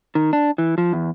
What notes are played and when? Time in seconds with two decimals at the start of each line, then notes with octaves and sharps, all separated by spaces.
0.15 D#3
0.33 D4
0.58 E3
0.78 F3
0.93 E2